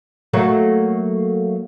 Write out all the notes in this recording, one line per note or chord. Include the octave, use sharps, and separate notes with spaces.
F#3 A3 A#3